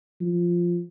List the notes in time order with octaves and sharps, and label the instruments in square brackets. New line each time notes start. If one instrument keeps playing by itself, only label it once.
[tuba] F3